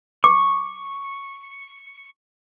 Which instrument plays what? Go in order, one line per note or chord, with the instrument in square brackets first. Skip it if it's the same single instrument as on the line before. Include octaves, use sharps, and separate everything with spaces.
[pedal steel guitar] C#6 [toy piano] D6